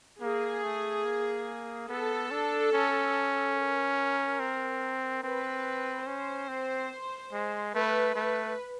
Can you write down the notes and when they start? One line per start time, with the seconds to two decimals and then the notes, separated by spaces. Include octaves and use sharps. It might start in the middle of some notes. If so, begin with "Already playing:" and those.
0.21 A#3 G#4
0.64 A3
1.05 A#3
1.89 B3 A4
2.31 D4
2.73 C#4
3.56 A#4
4.40 C4
5.24 C4 B4
6.07 C#4 C5
6.48 C4
7.33 G#3
7.75 A3 B4
8.16 A3 B4